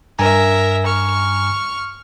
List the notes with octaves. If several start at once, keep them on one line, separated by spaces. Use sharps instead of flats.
G2 A#4 E5 G#5 A#5
C#6 F6